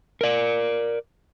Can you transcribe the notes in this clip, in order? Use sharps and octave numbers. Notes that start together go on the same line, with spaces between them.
A#4 D5